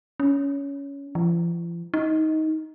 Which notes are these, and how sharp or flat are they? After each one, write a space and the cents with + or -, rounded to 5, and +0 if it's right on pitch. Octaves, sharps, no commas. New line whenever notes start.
C#4 +15
F3 -45
D#4 +15